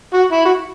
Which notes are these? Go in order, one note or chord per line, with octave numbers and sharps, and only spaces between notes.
F#4
E4
F#4